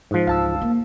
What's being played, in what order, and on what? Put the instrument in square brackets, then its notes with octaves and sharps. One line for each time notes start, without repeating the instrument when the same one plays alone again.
[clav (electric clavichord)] G#2 F3
[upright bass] C#2 E3 [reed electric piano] F5 A5 E6
[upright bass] A#3